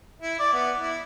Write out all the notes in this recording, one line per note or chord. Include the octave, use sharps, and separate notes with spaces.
E4
D5
B3
E4